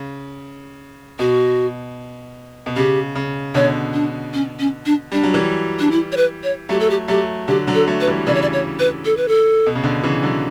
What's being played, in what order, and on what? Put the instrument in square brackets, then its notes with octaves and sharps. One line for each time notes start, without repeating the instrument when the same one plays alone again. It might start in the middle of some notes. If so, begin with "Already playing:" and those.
Already playing: [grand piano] C#3
[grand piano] B2 [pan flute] F#4
[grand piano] B2
[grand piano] C#3 [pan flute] G4
[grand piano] C#3
[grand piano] B2 D3 [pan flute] C#5
[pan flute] D4
C#4
C#4
D4
[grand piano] G3 [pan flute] D4
[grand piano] F#3
E3 G3
[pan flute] D4
E4
C#5
B4
C#5
[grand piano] F#3 A3 [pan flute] G4
[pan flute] A4
G4
[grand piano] F#3 A3 [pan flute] G4
[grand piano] D3 F#3 [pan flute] G4
[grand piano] D3 F#3
[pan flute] A4
[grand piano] F#3 A3
[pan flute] B4
[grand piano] E3 G3
[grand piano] C#3 E3 [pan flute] D5
[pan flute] C#5
D5
C#5
B4
A4
B4
A4
[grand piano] B2
C#3
B2 D3
C#3 E3
D3 F#3